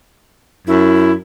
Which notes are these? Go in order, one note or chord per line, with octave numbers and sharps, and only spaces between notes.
F#2 E4